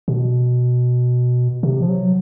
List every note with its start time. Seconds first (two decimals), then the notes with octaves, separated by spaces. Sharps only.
0.08 B2
1.63 C3
1.82 F3
1.89 F#3